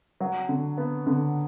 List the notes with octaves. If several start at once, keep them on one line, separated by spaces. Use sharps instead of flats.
F#3
D3
B3
D3